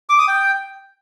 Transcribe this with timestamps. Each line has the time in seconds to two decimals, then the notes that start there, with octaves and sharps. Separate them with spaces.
0.09 D6
0.19 D#6
0.28 G5